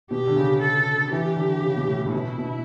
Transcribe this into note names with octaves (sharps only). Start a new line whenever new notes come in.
B2 G4
D3
C#3
A4
E3 G4
D3
C#3
B2
A2
A2
B2 E4
B2